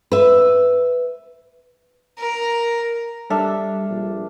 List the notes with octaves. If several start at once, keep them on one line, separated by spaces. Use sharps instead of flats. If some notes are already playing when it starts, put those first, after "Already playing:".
B4 E5
A#4
G3 D4 A4 E5 F6
A#1